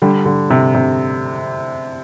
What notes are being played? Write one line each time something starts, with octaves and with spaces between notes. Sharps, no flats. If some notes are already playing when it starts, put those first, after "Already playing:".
D3 G3
D3
C3
C3